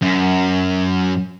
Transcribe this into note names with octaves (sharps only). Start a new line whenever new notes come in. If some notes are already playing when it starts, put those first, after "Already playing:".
F#2